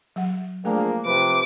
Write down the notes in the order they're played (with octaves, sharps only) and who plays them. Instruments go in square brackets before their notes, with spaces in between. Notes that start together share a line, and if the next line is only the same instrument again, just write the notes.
[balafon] F#3 F#5
[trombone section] F3 D4 G#4 [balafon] A3 [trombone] A#3
[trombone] C3 [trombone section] F3 B4 [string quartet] D6